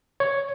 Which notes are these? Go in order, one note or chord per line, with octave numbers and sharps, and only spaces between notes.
C#5